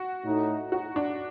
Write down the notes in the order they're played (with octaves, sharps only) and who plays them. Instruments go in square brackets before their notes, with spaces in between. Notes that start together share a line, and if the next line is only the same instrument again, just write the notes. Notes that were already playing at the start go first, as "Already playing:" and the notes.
Already playing: [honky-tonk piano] F#4
[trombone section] A2 A3 D#4
[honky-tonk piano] F#4
D4